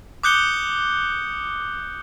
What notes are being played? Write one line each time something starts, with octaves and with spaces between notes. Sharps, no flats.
D6 D#6 F#6 G6 C#7 G7